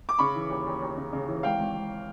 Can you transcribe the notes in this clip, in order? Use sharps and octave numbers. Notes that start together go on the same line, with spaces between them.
D6
C#3 B5 C#6
E3
D#2
D#2
D#2
C#3
C#3
E3
G#1 F5 G5
G#1
G#1